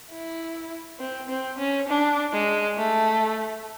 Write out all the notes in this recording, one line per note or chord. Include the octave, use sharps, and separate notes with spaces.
E4
C4
C4
C#4
D4
G#3
A3